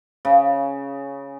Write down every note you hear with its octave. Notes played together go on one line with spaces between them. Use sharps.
C#3